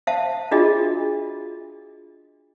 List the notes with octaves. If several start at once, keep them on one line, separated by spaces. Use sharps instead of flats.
C5 E5 F5 A5
D4 F4 F#4 G#4 D#5